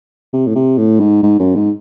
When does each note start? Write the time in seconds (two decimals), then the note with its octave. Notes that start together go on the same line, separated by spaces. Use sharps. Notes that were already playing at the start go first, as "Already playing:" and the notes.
0.33 C3
0.47 A2
0.55 C3
0.78 A2
1.00 G#2
1.23 G#2
1.39 F#2
1.56 G#2